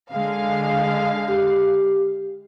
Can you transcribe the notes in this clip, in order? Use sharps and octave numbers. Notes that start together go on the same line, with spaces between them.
D3 G#3 F5
G4